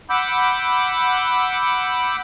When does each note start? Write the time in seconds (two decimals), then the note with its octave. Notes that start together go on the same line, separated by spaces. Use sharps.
0.10 F#5 B5 D6 E6 G6